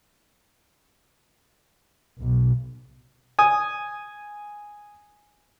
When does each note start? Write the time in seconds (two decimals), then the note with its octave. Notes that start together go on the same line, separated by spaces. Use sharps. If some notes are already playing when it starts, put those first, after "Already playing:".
2.18 B1
3.39 G#5 D#6